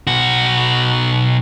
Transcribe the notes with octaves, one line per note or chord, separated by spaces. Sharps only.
B1 F#4